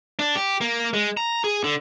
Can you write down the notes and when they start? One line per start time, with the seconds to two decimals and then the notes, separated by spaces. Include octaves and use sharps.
0.19 D4
0.36 G4
0.61 A#3
0.93 G#3
1.17 A#5
1.44 G#4
1.64 D3